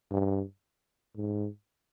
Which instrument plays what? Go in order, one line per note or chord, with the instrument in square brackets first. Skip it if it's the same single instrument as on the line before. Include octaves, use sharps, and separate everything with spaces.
[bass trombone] G2
G#2